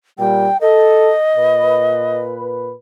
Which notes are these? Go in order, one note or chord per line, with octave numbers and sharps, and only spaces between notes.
A#2 G3 G5
A4 D#5
A#2 B4